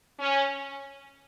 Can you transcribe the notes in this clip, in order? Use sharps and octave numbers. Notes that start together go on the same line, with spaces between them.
C#4